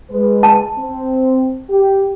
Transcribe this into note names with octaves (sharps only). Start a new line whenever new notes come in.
G#3 B4
A5
C4
G4